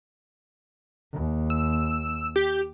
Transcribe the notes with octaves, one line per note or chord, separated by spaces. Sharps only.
D#2
E6
G4